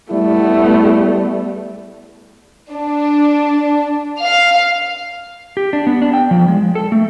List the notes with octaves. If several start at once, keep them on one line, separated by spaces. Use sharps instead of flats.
G3 A3 B3 E4
D4
F5
G4
D4
B3
D4
G5
F3
G#3
A4
A3